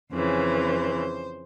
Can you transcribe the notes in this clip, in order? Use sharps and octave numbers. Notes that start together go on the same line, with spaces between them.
F2 C#3 E3 C5